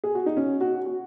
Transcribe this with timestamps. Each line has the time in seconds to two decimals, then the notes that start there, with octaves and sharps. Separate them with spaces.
0.04 G#4
0.15 F#4
0.26 D#4
0.37 C#4
0.61 F#4
0.86 F#4